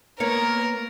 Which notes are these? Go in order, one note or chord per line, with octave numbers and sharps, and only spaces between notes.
A#3 B3 A#4 C#5